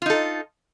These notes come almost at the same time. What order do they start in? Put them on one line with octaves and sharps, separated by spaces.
F4 D#4 A4